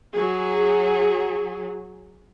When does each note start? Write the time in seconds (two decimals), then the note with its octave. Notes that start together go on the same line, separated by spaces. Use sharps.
0.12 F#3 G#4